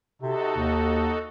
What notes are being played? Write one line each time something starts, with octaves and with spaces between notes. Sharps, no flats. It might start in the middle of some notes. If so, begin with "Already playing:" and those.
C3 D#4 F#4 A4
D#2